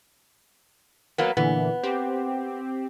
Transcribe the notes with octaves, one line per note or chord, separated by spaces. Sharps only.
F#3 A#3 B3
A#2 D3 E3 B3
C4 G4